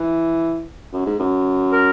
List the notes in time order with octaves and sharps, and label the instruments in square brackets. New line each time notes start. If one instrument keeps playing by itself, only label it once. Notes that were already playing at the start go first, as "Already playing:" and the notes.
Already playing: [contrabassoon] E3
F#2
G#2
F#2
[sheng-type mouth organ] A#4